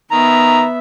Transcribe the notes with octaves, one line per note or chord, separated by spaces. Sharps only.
D#3 B3 E5 A#5